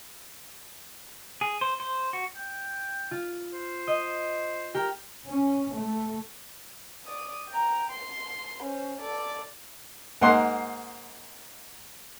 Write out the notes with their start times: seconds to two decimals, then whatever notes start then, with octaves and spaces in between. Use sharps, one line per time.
1.41 G#4
1.61 C5
1.80 C5
2.13 F#4
2.36 G5
3.11 F4
3.53 C5
3.87 D#5
4.74 G4 A#4
5.27 C#4
5.78 A3
7.05 D5 D#6
7.49 G5 A#5
7.91 C6
8.63 C#4 C5
9.01 A4 D5
10.21 G#2 A#3 F#5 C6